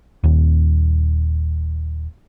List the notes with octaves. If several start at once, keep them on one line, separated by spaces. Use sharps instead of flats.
D#1 D#2